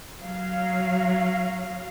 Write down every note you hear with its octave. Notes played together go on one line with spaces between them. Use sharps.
F#3 F5